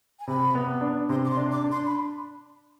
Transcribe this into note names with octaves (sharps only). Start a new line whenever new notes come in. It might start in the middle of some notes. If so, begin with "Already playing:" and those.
G#5
C3 B5
B3
D4
C3 C6
D6
C6
D4
D6
D4
C6
B5